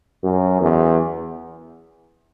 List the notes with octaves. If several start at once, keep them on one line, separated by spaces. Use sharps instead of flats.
F#2
E2